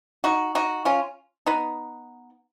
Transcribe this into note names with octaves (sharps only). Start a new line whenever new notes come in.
D#4 F#4
D#4 F#4
C#4 F4
B3 D#4